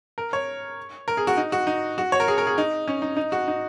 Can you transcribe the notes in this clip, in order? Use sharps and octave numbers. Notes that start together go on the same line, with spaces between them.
A#4
C#5
A#4
G#4
F#4
D#4
F#4
D#4
F#4
C#5
A#4
G#4
A#4
G#4
D#4
C#4
D#4
D#4
F#4
D#4